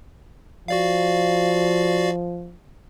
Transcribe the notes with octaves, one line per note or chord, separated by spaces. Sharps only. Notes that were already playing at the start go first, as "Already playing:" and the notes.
F3 F#4 D5 F5